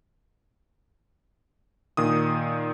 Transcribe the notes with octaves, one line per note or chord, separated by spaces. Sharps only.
A#2 D#3 D#6